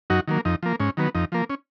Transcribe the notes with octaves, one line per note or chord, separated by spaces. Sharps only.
F#2 D#4 F#4
D#3 F#3 A#3
F2 D#4
F3 A#3
G#2 C#4
D#3 F#3 B3
F2 D#4
F3 A#3
C#4